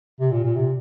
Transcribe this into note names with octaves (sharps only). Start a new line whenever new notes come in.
C3
A#2
A#2
C3